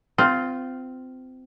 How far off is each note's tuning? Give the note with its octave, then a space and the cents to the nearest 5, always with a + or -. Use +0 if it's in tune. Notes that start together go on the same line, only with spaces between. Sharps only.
C4 -25 F4 +0